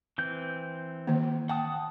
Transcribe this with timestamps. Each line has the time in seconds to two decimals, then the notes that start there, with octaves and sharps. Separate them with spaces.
0.18 E3 C4 G6
1.07 D#3 A#3
1.49 F#5 G5 A5 D#6